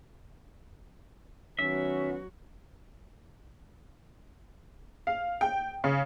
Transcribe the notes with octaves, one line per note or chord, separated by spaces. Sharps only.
D#3 F#3 B3 C#4 F#4 E5
F5
G5
C#3